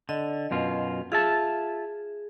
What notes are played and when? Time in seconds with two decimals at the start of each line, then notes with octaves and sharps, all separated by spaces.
0.09 D3 D#5
0.51 F#2 B2 F4
1.12 F4 G#4 E5 A5